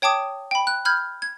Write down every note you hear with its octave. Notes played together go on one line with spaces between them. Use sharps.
C#5 G5 A5 D6 D#6
G5 B5
F#6
B5 F6 G6 G#6
G#6